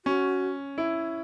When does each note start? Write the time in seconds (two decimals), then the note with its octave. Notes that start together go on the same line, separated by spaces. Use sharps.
0.05 C#4 F#4
0.78 E4